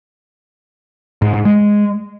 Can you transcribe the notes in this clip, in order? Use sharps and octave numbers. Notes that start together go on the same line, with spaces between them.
G#2
G#2
G#3